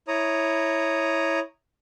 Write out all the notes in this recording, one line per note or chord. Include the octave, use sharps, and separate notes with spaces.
E4 C#5 A#5 D#6